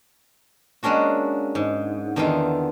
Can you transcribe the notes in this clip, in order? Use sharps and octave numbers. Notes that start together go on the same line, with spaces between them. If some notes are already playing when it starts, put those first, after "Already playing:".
G#3 A#3 C#4 D4 F#4
G#2
E2 D3 D#3 B3 F4 E5